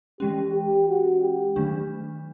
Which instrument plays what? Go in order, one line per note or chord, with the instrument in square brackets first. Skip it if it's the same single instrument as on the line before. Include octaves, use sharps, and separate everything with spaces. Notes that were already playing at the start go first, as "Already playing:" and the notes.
[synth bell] E3 G#3 C#4 [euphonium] G4
[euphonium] G4
F#4
G4
[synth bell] D#3 F#3 A3 D4